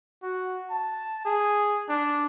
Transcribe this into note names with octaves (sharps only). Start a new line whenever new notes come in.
F#4
A5
G#4
D4